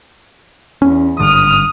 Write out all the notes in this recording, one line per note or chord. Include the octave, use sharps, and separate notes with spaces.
E2 C#4
G#1 G2 D3 D#6 F6